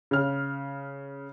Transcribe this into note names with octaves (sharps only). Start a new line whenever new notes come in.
C#3 F6